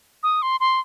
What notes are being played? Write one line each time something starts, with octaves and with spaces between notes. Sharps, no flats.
D#6
C6
C6